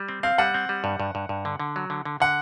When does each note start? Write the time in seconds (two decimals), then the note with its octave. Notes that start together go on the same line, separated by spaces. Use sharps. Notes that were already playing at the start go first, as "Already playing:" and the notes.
Already playing: G3
0.08 C4
0.23 C4 F5
0.38 G3 F#5
0.54 C4
0.69 G3
0.84 G2
1.00 G2
1.15 G2
1.29 G2
1.45 D3
1.60 D3
1.76 F#3
1.90 D3
2.05 D3
2.20 D3 F#5